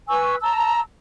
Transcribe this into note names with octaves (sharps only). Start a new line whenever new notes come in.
B4 G#5 C#6 E6
A5 A#5 E6